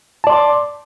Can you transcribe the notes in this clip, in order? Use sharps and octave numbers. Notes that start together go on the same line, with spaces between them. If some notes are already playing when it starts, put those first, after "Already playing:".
D5 A5 C6 D6